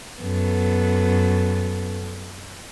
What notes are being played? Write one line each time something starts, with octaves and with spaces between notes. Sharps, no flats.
F#2 B3 A4